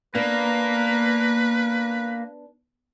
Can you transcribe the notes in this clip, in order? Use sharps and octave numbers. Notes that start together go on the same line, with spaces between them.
A#3 B3 D4 B4